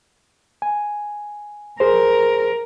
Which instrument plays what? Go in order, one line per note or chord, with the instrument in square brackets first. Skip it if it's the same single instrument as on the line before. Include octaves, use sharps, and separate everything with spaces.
[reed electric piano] G#5
[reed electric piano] G#4 C5 [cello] A#4